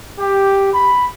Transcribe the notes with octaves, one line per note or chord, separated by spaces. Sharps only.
G4
B5